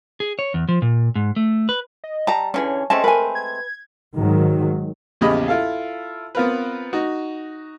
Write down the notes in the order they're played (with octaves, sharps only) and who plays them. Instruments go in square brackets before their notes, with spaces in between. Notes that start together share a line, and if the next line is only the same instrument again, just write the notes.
[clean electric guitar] G#4
C#5
E2
F3
A#2
G#2
A3
B4
[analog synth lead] D#5
[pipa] G3 [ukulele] A5 A#5
[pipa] D3 E3 [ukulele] C#4 G#4 [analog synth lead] C#5
[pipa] G#3 A3 C4 [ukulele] C#4 A5 [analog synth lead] D#5
[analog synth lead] A#4 [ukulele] B4 G#5
[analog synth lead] G#6
[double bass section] G#2 D#3 F#3
[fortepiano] A#1 E2 C#3 G4 D#5 B5
E4 F4 A4 F5
B3 C4 F4 A#4 B4
D#4 F#4